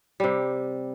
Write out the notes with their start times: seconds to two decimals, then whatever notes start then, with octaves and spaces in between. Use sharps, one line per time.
0.20 C3 G3